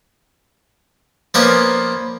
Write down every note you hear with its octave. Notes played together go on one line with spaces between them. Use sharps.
F3 A#3 B3 C#4 B4 D5